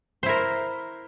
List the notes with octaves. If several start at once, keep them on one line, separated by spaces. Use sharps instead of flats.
E4 A#4 C5